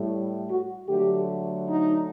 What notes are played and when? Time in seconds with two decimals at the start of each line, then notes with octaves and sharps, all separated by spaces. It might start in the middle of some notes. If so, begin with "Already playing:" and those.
Already playing: A2 G3
0.48 F#4
0.88 D3 F#3 A3 G4
1.67 D#4